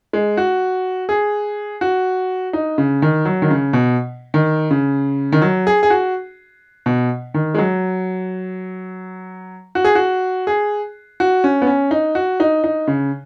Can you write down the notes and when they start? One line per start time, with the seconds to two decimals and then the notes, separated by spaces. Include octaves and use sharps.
0.13 G#3
0.37 F#4
1.09 G#4
1.81 F#4
2.53 D#4
2.78 C#3
3.02 D#3
3.25 F#3
3.42 D#3
3.50 C#3
3.73 B2
4.34 D#3
4.71 C#3
5.32 D#3
5.42 F#3
5.67 G#4
5.83 G#4
5.90 F#4
6.86 B2
7.34 D#3
7.55 G#3
7.58 F#3
9.75 F#4
9.85 G#4
9.95 F#4
10.47 G#4
11.20 F#4
11.44 C#4
11.62 B3
11.67 C#4
11.91 D#4
12.15 F#4
12.40 D#4
12.64 D#4
12.87 C#3